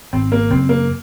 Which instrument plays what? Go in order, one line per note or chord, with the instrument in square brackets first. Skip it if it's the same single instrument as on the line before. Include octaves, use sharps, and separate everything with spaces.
[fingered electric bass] G#1 [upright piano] C4
[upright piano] A#3
[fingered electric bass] F#2 C#3 [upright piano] C4
[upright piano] A#3